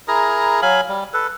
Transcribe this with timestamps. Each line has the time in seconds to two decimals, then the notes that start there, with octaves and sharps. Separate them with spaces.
0.08 E4 G#4 A#4 A#5
0.62 F#3 F5 G#5 B5
0.89 G3
1.14 A4 B4